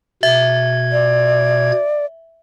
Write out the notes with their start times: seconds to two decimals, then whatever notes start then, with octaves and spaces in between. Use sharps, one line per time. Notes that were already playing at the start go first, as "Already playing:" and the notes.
0.23 B2 E5 G#6
0.92 D5